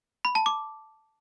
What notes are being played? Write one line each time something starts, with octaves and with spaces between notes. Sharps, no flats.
B5
A5
D6